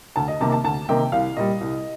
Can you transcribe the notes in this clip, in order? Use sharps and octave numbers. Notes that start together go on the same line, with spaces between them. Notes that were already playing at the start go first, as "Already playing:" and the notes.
D2 A5
D#5
C3 D#3 A#3 A5
A5
D2 A5
C3 D#3 A#3 G5
C2 F5
A#2 G3 D#5
C2